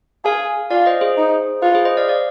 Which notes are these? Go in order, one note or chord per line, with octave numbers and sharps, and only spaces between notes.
G#4 F5 G#5
F4 D5 F5
C5 D#5
G#4 C5
D#4
F4 B4
G#4 C5
C5 D#5
D5 F5
D5 F5